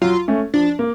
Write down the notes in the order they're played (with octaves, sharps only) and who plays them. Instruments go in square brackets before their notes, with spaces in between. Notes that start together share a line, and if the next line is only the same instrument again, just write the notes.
[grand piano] F#3 [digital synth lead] F4
[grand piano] A3 C#4
[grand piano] F3 [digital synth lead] D4
[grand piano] A#3